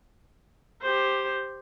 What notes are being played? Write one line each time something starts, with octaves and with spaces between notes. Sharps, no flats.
G4 C5